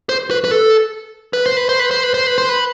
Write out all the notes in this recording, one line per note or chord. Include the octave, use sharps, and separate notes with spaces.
C5
B4
B4
A4
B4
C5
B4
C5
B4
C5
B4
C5
B4
C5
B4